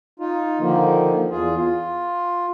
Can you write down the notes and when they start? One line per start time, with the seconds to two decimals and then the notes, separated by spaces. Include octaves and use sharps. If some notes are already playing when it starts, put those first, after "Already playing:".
0.20 D#4 F4
0.59 D3 D#3 F3 A#3
1.31 E2 F4 G#4
1.57 F4